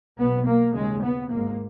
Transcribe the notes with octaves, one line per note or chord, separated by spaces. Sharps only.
B1 B2 B3
A#3
D#2 C#3 G#3
B3
G#1 G#2 A#3